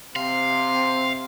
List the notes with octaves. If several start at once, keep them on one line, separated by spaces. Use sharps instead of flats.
C3 C4 F5 C6